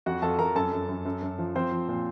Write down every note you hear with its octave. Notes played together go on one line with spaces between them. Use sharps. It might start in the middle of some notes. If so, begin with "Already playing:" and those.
F2 F#4 F#5
F2 A4 A5
F2 A#4 A#5
F#2 A4 A5
F#2
F#2
F#2
F#2
F3
F3 C4 C5
F3
A#2